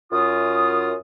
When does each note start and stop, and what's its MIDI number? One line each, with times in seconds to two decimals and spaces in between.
0.12 0.93 42
0.12 0.93 65
0.12 0.93 87